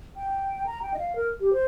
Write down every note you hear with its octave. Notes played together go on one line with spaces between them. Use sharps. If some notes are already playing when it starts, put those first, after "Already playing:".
G5
A#5
G5
D#5
F5
A#4
G4
C5